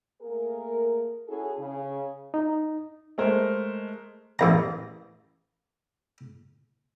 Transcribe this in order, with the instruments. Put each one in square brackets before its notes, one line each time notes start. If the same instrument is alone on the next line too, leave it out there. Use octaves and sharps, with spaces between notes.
[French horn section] A3 A#3 G#4 A#4
C#4 E4 F#4 G#4 A4
C#3
[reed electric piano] D#4
[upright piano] G#3 A3 A#4 C5
[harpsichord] A1 E2 A#5